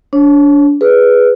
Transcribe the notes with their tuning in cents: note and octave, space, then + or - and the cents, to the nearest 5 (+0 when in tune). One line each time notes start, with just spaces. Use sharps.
D4 -30 C#5 -25
G#4 +0 B4 +0